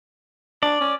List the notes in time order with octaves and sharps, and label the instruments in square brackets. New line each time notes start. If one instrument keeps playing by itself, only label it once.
[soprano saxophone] D4 [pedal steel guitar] D5
[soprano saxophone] C#4